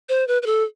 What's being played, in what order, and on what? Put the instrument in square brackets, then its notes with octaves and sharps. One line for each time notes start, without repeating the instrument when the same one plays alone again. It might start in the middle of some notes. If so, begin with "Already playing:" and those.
[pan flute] C5
B4
B4
A4